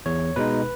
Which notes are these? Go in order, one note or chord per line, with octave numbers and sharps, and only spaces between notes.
E2 C#5
B2 G#3 D#4 B4